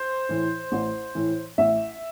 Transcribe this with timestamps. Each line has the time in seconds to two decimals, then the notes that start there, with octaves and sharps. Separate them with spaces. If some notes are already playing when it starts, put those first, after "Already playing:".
Already playing: C5
0.29 A2 E3
0.72 A1
1.15 A2 E3
1.58 A1 E5